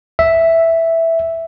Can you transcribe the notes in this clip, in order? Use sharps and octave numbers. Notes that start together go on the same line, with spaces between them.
E5